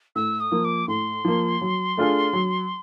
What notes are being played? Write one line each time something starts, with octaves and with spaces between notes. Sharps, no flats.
A2 E6
D#6
F3 A#3
D6
A2 C6
F3 A#3
F#3
A3 D4 F4 G#4
F#3